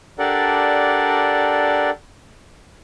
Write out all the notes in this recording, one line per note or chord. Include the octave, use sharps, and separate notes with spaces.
D4 G4 A4 A#4 D5 F#5